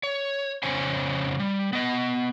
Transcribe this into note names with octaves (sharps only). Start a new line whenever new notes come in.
C#5
F2 C#3 C5 C#5 G#5
G3
B3 D#5